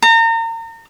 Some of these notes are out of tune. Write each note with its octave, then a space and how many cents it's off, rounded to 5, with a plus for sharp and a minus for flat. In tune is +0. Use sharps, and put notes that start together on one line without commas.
A#5 -35